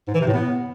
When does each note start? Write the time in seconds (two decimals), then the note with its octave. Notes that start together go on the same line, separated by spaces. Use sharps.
0.08 G#2
0.14 E3
0.21 C3
0.27 A2
0.34 B3